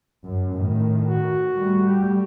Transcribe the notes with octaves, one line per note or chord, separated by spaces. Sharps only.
F#2
A2 D#3
F#4
G3 A3
G4